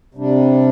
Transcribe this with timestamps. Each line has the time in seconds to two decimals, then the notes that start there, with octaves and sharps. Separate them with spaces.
0.14 C3 G3 D4